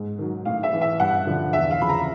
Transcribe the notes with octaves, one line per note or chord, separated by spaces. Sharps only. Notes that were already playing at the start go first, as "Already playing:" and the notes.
Already playing: G#2
D#3 F#3
A2 F5
E5
E3
E5
G2 F#5
D3 F3
E2 E5
F5
C#3 F3 B5
A#5